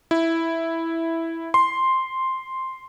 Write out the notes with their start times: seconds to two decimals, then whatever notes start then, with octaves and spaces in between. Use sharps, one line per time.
0.11 E4
1.54 C6